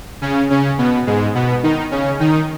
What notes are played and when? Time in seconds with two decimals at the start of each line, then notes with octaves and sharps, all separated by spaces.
0.21 C#3 C#4
0.50 C#3 C#4
0.78 B2 B3
1.07 G#2 G#3
1.35 B2 B3
1.63 D#3 D#4
1.91 C#3 C#4
2.20 D#3 D#4